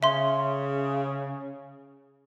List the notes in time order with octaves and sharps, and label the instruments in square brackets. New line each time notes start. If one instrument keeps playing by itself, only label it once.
[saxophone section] C#3 [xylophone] E5 C6